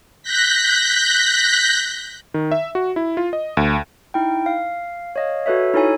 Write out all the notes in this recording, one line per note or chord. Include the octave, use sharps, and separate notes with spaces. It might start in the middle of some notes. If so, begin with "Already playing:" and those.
F#6 G6 A#6 B6
D#3
E5
F#4
E4
F4
D#5
D2
D#4 E4 G5
F5
C#5 D#5 F5
F#4 A4 B4 C#5 E5
D#4 E4 A4 C#5 G#5